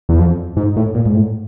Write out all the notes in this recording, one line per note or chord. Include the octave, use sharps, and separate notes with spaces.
E2
F2
G#2
A2
A#2
G#2
A2